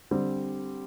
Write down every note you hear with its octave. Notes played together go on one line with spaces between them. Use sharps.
D3 G3 C4